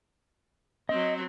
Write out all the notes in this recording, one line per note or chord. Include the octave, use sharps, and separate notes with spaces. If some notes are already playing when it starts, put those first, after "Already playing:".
F#3 C4 D#5